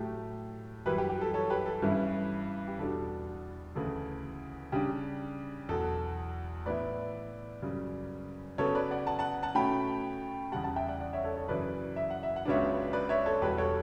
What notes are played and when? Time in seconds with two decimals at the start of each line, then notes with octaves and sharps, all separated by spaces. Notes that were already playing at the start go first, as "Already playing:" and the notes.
Already playing: A2 F#3 A3 G4
0.86 F#2 E3 G3 G4 B4
0.98 G4
1.10 G4
1.21 A4
1.34 A4 C#5
1.50 G4 B4
1.66 A4
1.82 G2 E3 G3 C#4 E4
2.67 G4
2.78 E2 B2 G3 D4 A4
3.75 D2 C#3 E3 A4
4.72 C#3 G3 D4 G4
5.69 E2 B2 F#3 A4
6.66 A2 E3 B3 E4 B4 D5
7.62 F#2 C#3 G3
8.58 C#3 F#3 B3 A4 C#5
8.75 B4 D5
8.91 D5 F#5
9.07 F#5 A5
9.19 F#5 A5
9.43 F#5 A5
9.55 B2 A3 C#4 G5 B5
10.52 E2 C#3 G3 F#5 A5
10.64 F#5 A5
10.76 E5 G5
10.88 D5 F#5
11.00 D5 F#5
11.13 C#5 E5
11.24 A4 C#5
11.36 A4 C#5
11.48 F#2 C#3 E3 B4 D5
11.96 E5
12.10 F#5
12.23 E5
12.36 F#5
12.45 C#2 C#3 F#3 B3 D4 C#5 E5
12.93 B4 D5
13.09 C#5 E5
13.26 A4 C#5
13.42 E2 B2 G3 G4 B4
13.58 A4 C#5